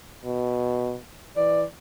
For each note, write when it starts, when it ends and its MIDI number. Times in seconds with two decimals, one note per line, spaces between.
0.24 0.96 47
1.37 1.64 52
1.37 1.62 74